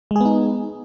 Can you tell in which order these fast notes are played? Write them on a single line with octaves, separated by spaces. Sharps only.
G#3 G#4 B3 D#4